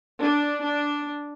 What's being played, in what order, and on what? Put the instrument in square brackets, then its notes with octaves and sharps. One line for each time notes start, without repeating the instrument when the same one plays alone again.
[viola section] D4
D4